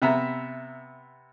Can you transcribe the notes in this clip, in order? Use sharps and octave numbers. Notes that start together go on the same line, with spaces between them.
C3 B3 E5 A#5